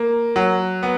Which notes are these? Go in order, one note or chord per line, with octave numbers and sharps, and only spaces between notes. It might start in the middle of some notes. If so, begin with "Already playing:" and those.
Already playing: A#3
F#3
B3